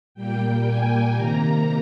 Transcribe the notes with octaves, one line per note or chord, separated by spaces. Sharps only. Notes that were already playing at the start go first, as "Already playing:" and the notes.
A#2 G3 A#3 G5
G#5
C3 D#3 A#3 A#5